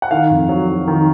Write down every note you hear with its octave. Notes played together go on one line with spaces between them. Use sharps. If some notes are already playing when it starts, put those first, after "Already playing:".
F#5
D#3 F5
F2
F#3
F#3
D#3